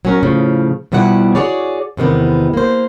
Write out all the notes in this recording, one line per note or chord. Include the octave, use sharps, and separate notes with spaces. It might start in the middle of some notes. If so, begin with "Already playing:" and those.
F#3 C#4 A#4
A2 C#3 F3
B2 F3 G3 E4 F#5
F#4 G#4 C#5 D5
E2 C3 D#3 B3
A#3 C5